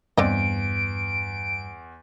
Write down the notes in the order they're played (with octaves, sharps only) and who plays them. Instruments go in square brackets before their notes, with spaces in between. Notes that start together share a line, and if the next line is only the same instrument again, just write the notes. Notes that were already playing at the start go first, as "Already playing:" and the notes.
[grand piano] E2 [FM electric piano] G2 [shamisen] C4 D5 D#5 [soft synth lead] D7